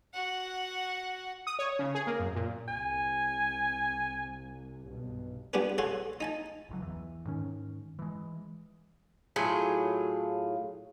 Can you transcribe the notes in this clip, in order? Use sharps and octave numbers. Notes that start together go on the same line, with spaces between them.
F#4 F#5
D#6
C#5
C#3
G#4
A#3
F#2
A#2
C2 G#5
B1 G2 B2
G3 B3 D4 G4 G#4 B4
G#4 A4 C#5 F#5 C6
D#4 G#5 A5
G1 C#2 F#3
E2 E3
G#2 D#3 C#4
E3 G#3
A2 F#3 F4 G#4